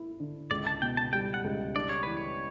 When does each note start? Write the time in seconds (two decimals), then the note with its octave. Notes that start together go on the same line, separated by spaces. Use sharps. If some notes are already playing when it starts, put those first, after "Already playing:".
Already playing: E4
0.20 D3
0.51 C#2 D5
0.67 A5
0.82 B2 G5
0.97 A5
1.13 G3 G5
1.34 F#5
1.44 C#2
1.76 D4 D5
1.89 C#5
2.03 E3 B4
2.17 C#5